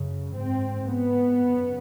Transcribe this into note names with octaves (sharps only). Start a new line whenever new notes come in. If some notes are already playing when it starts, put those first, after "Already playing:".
Already playing: F#2 C#3
G#2 C4
B3
F#2 C#3